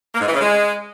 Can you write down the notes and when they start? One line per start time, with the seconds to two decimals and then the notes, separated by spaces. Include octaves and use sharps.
0.13 A#3
0.20 G#2
0.27 E3
0.34 C#3
0.40 G#3